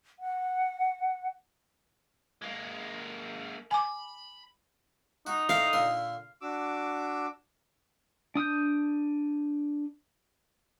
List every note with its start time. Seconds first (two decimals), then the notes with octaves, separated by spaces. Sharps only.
0.20 F#5
2.42 G#3 A#3
3.71 G#5 B5 D6
5.27 D#4 F#4
5.49 A2 C5 F5 G5
5.73 A#2 D3 C6
6.41 D4 F#4 D6 E6
8.35 D4 D#6 F6 G6